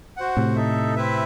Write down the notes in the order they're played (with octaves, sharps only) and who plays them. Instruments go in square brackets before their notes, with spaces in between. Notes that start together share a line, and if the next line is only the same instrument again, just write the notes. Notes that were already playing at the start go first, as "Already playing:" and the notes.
[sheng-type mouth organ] F#4 C5 F#5
[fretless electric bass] A2 C3
[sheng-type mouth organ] D#4 A4 E5
C4 E4 B4 E5